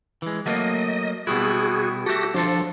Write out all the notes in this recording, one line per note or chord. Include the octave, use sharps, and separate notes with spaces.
E3 G#3
F#3 A3 A#3 D#5
B2 G3 E4 F#4 G#4
F#4 G4 A4 E5 A#6
F3 D4 F4 A4